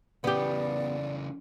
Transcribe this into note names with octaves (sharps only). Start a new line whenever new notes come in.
C#3 E3 B3 G4 D5